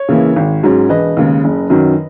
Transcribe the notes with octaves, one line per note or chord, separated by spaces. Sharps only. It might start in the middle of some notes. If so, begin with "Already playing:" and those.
Already playing: C#5
C#3 E3 A#3 E4
G#1
G#2 F#3 C#4
E1 B4 D#5
D#2 C#3 G#3
F#1
F#2 D#3 F#3